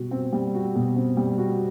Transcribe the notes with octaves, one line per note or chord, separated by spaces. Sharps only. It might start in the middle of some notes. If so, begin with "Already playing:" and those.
Already playing: B2 G3 F#4
C4
G3
F#4
B2
C4
G3
F#4